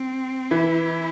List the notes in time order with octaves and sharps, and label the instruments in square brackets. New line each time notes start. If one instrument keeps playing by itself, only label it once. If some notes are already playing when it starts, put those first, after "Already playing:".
Already playing: [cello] C4
[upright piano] E3 [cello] E4